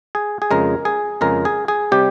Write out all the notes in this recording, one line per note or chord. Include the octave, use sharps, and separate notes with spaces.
G#4
G#4
F2 C#3 G#3 A#4
G#4
F2 C#3 G#3 A#4
G#4
G#4
C3 G3 G4